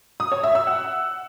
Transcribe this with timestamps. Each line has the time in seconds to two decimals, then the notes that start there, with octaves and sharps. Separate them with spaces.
0.20 D#6
0.32 C#5
0.43 E5
0.55 E6
0.67 F#5